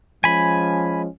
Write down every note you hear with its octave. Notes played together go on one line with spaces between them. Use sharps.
F3 G#3 C#4 G#5 B5